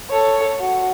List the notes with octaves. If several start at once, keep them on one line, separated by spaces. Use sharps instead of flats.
A4 C#5
F#4